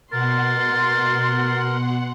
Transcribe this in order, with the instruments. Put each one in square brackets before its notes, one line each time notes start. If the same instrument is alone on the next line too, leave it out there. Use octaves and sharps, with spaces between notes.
[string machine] B2 F#5 [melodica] A#4 [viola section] C6 [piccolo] A6